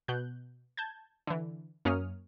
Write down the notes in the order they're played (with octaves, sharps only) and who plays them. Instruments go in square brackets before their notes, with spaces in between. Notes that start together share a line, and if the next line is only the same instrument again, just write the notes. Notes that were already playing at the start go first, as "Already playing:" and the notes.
[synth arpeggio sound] B2 F#6 G6
A5 G6 G#6
D3 E3
F#2 A#3 C#4 C#5 D#6 F6